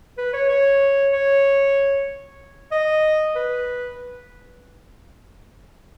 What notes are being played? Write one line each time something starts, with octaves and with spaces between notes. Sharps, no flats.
B4
C#5
C#5
C#5
D#5
B4